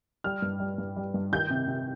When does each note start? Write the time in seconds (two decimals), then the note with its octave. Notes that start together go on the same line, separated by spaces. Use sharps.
0.24 G3 F6
0.42 G2
0.60 G3
0.78 G2
0.96 G3
1.14 G2
1.32 D#3 G6
1.50 C3
1.68 C3